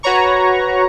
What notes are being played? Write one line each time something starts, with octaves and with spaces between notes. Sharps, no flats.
F#4 B4 C#5 A#5 C#6